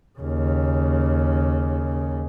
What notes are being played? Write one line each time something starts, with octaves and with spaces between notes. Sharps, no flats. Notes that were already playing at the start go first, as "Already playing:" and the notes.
D#2 C#3